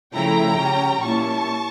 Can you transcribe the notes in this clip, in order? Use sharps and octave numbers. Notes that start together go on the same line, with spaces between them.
C#3 F3 A3 E4 G5 A#5
C#3 G3 C#4
A#2 G3 A#3 C#4 E4 A5 C#6